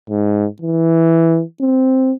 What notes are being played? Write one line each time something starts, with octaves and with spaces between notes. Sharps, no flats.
G#2
E3
C4